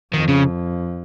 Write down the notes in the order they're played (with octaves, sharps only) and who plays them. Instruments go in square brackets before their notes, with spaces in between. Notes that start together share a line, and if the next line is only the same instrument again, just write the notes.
[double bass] F2 [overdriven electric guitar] D#3
[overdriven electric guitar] C#3